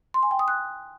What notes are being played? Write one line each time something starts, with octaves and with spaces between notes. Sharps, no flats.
C6
G#5
G5
D#6
F#6